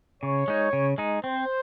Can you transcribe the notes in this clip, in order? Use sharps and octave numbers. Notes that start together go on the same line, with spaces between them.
C#3 C#5
G#3 D#4
C#3
G#3 D#4
C4 C5